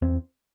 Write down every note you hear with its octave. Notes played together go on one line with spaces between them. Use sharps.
E2 C4